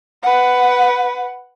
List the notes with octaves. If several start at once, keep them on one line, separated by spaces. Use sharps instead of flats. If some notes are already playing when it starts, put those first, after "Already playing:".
B4 F#5